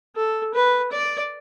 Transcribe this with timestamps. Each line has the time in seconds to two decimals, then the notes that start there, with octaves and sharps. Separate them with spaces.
0.16 A4
0.54 B4
0.92 D5